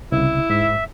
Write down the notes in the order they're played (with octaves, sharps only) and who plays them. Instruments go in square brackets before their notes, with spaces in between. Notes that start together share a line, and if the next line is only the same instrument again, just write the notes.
[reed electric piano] C2 C#3 [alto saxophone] E4
[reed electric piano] G#2 [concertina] E5